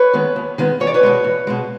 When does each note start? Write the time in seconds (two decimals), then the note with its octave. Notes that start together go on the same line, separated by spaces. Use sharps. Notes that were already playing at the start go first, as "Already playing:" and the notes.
Already playing: B4 C#5
0.13 D#3 G#3 B3
0.36 D#2
0.58 D#3 G#3 B3
0.80 E2 C#5
0.87 D5
0.94 B4 C#5
1.03 B2 G#3
1.24 E2
1.47 B2 G#3